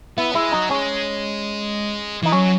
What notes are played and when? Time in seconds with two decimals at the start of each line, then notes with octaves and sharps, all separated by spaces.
0.17 B3 E4
0.35 G#3 E4
0.53 F#3 D#4
0.71 G#3 C#4
2.23 E3 D#4
2.32 F#3 C#4